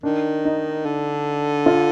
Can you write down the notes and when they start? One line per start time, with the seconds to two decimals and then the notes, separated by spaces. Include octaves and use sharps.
0.03 D#3 D4
0.45 D#4
0.86 D3
1.66 F4